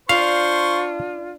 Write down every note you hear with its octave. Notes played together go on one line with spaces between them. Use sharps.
D4 F4 C5 F5 C#6